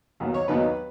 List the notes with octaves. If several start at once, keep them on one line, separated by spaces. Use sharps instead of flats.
D#2 D#3 F#3 B3 D#4
C#5
D#2 D#3 F#3 B3 D#4 B4